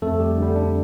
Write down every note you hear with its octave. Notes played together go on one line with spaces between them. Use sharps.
F2 A3 A4
G3 G4
D3 G3
D4